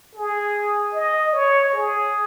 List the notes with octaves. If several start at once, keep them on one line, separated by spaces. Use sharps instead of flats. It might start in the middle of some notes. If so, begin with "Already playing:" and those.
G#4
D#5
C#5
G#4